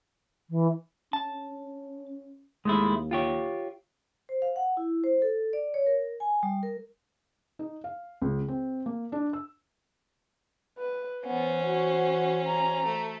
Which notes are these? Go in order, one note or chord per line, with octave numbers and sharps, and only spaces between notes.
E3
C#4 A5
D#2 G#3 A3 E4
F4 G4 C#5
C5
F5
F#5
E4
C5
A4
D5
C#5
A#4
G#5
G3
A#4
D#4
F5
C#2
C4
A#3
D4
E6
B4
E3 B3 C#4 C5
F#4
A#5
A3